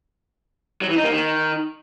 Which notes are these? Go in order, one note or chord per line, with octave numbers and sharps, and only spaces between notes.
F#3
E3
D#4
A#3
D#3